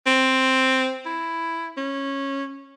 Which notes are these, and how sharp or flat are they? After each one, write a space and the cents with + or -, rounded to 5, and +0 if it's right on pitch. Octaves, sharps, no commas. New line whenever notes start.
C4 +0
E4 +5
C#4 -15